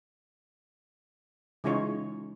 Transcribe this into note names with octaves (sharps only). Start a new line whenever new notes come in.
C#3 E3 G#3 D#4 F4 C#5